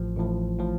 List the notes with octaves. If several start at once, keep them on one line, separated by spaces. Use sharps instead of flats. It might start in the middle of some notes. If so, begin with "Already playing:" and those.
Already playing: A1 A2 F3
A1 A2 F3
A2 F3